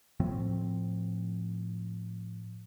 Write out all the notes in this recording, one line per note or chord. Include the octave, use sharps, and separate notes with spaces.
A2 F3 C4